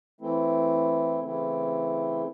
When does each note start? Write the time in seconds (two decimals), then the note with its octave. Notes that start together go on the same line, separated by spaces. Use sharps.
0.21 E3 A3 C4 E4
1.22 C#3 E3 A3 C4 E4